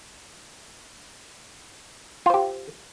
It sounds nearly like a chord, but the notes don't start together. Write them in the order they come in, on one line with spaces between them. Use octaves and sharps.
F4 C5 G4